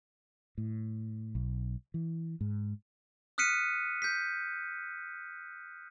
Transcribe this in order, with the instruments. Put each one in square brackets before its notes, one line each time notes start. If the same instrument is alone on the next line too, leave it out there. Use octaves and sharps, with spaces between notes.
[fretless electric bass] A2
B1
E3
G#2
[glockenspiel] D#6 F6 F#6 B6 C#7 D#7
G6 B6